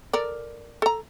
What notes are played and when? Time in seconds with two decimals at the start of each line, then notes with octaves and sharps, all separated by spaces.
0.13 A4 A#4 D5
0.82 A4 A#5